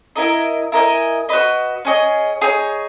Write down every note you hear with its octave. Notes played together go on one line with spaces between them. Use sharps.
E4 A#4 D#5
E4 A#4 D#5 G#5
F#4 B4 D#5
C#4 G#4 D#5
D#4 G#4 C#5